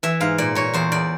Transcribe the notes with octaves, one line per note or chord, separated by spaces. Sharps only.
E3 E5
G#2 F5
A#2 D5
A#2 C#5
E2 C5
E2 D5